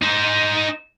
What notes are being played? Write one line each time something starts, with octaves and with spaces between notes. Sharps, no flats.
D#4 C5